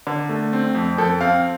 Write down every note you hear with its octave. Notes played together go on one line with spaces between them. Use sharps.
D3
A3
C4
F2
F2 A4
C4 F5